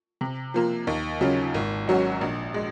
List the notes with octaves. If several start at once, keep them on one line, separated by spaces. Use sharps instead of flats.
C3
F3 A#3 F4
D#2
C#3 F#3 C#4 F4
G#1
G#2 F#3 C#4 F#4
A#1
G#3